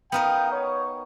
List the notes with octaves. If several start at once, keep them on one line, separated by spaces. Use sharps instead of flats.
B3 D#4 A#4 F5 G5
C#5